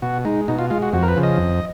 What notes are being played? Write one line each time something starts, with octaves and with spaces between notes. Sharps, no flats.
B2 F#4
G#3 D#4
B2 D#4
F4
G#3 F4
F#4
F2 F#4
A#4
B4
C#3 F3
D#5
F2